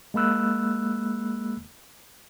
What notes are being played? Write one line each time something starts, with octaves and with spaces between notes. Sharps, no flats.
G#3 A#3 B5 E6 F#6